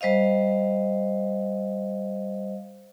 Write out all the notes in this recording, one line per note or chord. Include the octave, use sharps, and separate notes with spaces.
G3 C5 D#5 F5